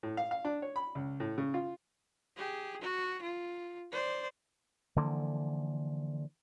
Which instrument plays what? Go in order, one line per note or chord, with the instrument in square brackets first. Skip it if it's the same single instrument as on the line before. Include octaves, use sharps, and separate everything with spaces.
[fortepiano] A2
F5
F5
D4
C#5
B5
C#2
A2
C#3
F4
[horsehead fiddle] G4 G#4
F#4
F4
C5 D5
[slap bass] D3 E3 F3 A#3